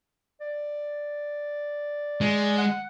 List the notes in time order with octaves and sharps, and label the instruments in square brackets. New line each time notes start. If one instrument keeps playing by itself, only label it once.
[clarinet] D5
[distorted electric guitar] G#3
[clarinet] F#5